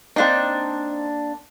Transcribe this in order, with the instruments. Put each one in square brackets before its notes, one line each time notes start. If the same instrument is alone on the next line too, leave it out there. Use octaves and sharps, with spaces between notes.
[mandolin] A#3 D4 C5 [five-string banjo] C4 D#4